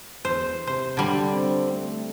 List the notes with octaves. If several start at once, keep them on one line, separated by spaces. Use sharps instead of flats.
E2 C5
C3 C5
D3 G3
C4
A3